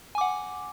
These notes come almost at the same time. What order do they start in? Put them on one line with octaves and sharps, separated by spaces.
G#5 D6 F#5